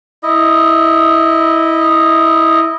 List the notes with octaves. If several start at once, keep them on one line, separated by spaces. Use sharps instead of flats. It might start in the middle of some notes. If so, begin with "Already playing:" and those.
E4 D#5